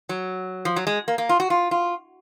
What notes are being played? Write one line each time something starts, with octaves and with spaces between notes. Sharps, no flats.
F#3
F3
F#3
G#3
A#3
A#3
F4
F#4
F4
F4